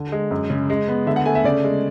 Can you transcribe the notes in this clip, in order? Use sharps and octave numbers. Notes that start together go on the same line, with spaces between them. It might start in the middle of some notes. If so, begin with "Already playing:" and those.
Already playing: D3
G#3
F#2
C#3
G#3
B3
D3 E5
F#5
A3 G#5
E5
C#3 D5
G#3